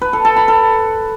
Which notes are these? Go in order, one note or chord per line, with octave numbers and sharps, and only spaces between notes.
B4
A4
A4
B5
A4